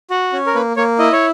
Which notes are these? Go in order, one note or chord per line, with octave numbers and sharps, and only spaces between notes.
F#4
C#4
A#4
A#3 B4
A#3 C#5
E4 D#5
C#5